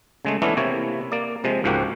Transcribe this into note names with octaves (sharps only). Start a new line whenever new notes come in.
C#3 G#3 A3
E3 A3 B3 C#4 D4 E4
C3 A#3 E4 C#5
A#3 D5
C3 F3 G#3
C#2 G#2 F3 A#3 F#4 G4